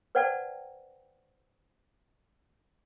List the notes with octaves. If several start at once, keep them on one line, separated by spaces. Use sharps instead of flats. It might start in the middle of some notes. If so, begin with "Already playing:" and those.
B4 C5 D5 F#5 G5 A5